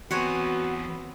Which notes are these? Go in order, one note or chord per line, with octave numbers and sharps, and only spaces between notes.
E2 B3 C4 F#4 C#5 F#5 G#5